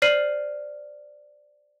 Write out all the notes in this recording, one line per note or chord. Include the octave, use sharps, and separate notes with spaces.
C5 D5 F6 C7 D#7 F#7